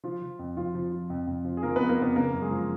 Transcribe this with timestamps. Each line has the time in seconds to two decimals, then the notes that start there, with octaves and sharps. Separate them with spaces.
0.04 F3 F4
0.22 F3
0.39 F2
0.57 F2 F3 F4
0.75 F3
0.92 F3
1.10 F2
1.27 F2
1.45 F3
1.57 G#4
1.63 F3 A#3 A#4
1.76 B3 B4
1.80 F2
1.89 A#3 A#4
1.98 F2 B3 B4
2.16 C#3 A#3 A#4
2.33 F#2
2.42 G#3 G#4
2.51 F3